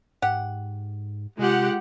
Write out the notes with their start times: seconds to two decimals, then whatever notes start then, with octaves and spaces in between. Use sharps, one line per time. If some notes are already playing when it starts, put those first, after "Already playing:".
0.22 G#2 G4 F#5
1.39 C3 G#3 F4 G4 F#5